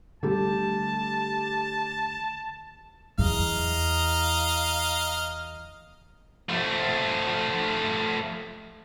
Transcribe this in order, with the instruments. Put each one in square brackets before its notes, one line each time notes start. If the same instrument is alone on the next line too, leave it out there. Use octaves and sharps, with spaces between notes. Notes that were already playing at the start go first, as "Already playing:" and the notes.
[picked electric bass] D3 A3 [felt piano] G3 G4 A4 [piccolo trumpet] A5
[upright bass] E2 E3 [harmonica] D#5 F5 A#5
[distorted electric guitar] F3 A3